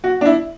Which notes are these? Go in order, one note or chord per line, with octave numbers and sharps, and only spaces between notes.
F#4
D4
E4